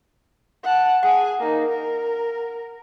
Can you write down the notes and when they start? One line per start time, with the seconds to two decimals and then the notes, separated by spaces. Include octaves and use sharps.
0.64 F#5 A5
1.03 G#4 F#5 G#5
1.39 A#3 D#4
1.69 A#4